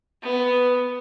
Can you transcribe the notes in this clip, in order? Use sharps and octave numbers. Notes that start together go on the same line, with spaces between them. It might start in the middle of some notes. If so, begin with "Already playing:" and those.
B3